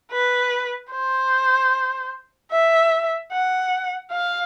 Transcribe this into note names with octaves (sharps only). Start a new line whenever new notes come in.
B4
C5
E5
F#5
F5